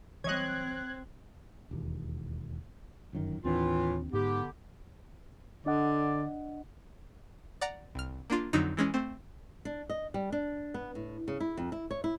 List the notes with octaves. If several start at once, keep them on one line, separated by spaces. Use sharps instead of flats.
E3 F#3 G3 C4 C#5 D#5 F#6 G#6
E1 D#2
G1 F#2 D#3
D#2 A2 E3 C4 D4 F4
G#2 D3 B3 G4
D3 D4 D5 D#5 F#5
D5 F#5 A#5
C2 F6
A#3 D4 F4
F2 D3 F#3 D#4
E3 G#3 C#4
A3 C4
D4
D#5
G3
D4
B3
A2
C#3
E4
F2
E4
C#5
E4